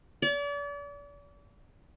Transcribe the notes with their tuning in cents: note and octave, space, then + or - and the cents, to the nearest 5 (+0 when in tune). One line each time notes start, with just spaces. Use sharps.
D5 -40